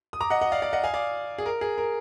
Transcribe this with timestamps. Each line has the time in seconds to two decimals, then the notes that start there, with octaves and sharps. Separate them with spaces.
0.13 D#6
0.20 A#5 D6
0.30 D#5 F#5
0.41 D#5 F#5
0.52 D5 F5
0.62 D5 F5
0.73 D#5 F#5
0.83 F5 G#5
0.94 D5 F5
1.38 G#4
1.46 A#4
1.61 G#4
1.78 A#4